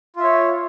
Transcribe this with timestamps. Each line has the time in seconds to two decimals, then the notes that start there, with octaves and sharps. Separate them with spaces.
0.16 F4
0.20 E5
0.24 C#5